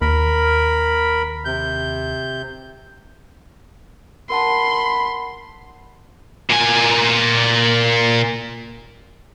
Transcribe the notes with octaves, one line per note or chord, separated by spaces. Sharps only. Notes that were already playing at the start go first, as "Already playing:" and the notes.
D#2 A#4 B5
C3 G6
A#4 F#5 A5 B5 C6
A#2 G#5